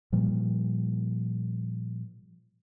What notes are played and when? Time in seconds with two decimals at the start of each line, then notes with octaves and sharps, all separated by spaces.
0.12 A#2 F3 G3